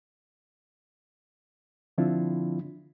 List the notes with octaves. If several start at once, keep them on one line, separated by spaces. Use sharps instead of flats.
D3 F3 C4 D4 E4 F4